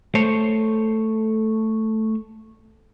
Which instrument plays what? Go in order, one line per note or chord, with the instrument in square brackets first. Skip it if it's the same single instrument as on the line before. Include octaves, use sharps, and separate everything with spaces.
[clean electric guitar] A3 C5 C#5